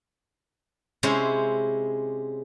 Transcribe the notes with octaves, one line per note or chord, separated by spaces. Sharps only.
C3 G#3 C#4 E4 C5